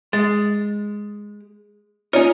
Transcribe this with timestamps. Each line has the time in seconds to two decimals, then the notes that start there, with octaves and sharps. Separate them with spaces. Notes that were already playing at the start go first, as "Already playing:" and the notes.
0.13 G#3 A6
2.13 C#4 D#4 F4 C#5 D5